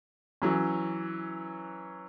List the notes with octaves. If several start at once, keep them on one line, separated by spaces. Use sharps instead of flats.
E3 F#3 C#4